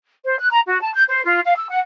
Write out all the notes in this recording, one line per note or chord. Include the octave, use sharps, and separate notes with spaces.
C5
F#6
A#5
F#4
A5
G6
C5
F4
F5
E6
F#5